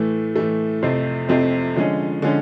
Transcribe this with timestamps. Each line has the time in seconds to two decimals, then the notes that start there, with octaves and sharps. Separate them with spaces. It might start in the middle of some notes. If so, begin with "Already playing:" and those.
Already playing: A2 E3 A3
0.36 A2 E3 A3
0.82 F2 C3 F3 A3 C4
1.29 F2 C3 F3 A3 C4
1.76 D3 F3 G#3 C#4
2.22 D3 F3 G#3 C#4